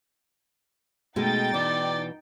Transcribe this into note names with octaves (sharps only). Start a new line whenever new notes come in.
B2 G#3 A3 D#4 G5 A6
B2 E3 D5